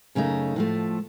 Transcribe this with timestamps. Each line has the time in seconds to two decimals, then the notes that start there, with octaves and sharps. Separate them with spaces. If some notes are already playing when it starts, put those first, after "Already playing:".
0.15 F#2 C#3 A3 D#4
0.56 A2 F3 A3